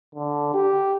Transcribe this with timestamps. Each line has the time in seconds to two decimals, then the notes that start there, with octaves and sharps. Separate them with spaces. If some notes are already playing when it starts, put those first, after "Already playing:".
0.15 D3
0.54 G4